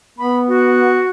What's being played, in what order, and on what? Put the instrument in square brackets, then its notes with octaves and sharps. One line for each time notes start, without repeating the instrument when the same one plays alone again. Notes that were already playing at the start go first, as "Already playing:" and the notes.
[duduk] B3 [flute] B5
[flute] F#4